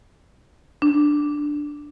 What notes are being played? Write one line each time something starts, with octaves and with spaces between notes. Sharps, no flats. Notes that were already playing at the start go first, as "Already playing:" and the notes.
D4